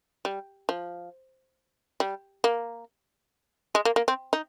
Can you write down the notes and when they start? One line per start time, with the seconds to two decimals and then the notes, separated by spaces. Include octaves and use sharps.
0.25 G3
0.69 F3
2.00 G3
2.44 A#3
3.75 G#3
3.85 A#3
3.96 A#3
4.08 C4
4.33 D#4